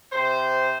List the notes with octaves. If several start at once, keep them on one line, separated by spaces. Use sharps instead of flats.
C3 C5